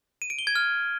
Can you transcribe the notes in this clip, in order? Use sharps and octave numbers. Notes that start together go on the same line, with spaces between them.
D#7
D7
G7
G#6
F6